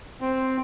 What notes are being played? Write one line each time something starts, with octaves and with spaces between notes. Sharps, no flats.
C4